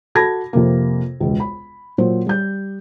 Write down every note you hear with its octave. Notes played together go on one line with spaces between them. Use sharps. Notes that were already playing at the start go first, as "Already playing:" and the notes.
F#4 A4 A5 B5 G#6 A#6
F2 C3 A#3
E1 C#2
B5
A#2 F#3 C5
G3 G6